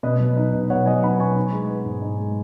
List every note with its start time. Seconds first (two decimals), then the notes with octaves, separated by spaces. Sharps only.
0.03 B2 B4 D#5
0.20 F#3
0.37 D#4
0.53 B2
0.70 B2 C#5 F#5
0.86 F#3 D#5 G#5
1.03 D#4 F#5 B5
1.20 B2 G#5 C#6
1.36 D#4
1.52 G#3
1.70 B3
1.85 G#2
2.02 D#4
2.19 G#3